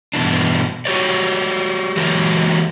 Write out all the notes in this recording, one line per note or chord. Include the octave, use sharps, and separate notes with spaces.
G2 B2 E3 D4
F#4 G4 C#5 D5
E3 F#3 G#3 A#3 G4